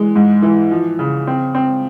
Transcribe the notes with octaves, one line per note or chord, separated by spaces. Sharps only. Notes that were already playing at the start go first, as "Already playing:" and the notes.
Already playing: E3 G#3
G#2
E3
F3
C#3
C4
C4